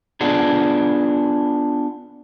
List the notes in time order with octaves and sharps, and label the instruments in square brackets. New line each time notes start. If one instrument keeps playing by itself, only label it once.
[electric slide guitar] B3 D4 F4 G#4